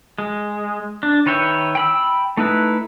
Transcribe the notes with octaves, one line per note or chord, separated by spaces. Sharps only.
G#3
D4
D#3 B4 C#5 E5 G5
G5 B5 E6
A3 D#4 E4 B4